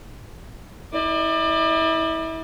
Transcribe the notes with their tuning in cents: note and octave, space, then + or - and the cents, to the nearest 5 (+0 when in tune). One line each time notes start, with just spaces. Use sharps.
E4 -30 D5 +30